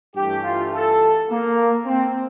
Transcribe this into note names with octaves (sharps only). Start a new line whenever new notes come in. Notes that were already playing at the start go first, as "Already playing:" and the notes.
G2 E3 A3 G4
F4
A4
A#3
C4